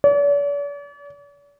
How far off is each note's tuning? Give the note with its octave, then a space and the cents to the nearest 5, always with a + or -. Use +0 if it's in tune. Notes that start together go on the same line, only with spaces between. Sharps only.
D5 -45